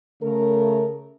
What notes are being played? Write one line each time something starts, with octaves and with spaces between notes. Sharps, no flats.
C#3 A3 A#4